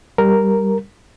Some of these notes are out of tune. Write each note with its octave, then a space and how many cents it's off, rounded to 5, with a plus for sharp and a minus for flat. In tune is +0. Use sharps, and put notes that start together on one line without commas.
G3 +0 A#4 +0